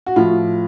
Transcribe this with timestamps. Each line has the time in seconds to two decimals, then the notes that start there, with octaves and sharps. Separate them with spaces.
0.06 F#4
0.16 A2 F3 F4